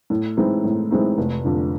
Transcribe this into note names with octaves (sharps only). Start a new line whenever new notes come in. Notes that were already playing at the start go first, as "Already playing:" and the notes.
A2
E3 G#3 C4 D#4
A2
E3 G#3 C4 D#4
F1
F2 D3